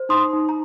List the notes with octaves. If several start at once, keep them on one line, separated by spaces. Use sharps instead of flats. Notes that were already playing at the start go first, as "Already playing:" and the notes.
Already playing: C5
D#4 C6 D#6
D#4
A#5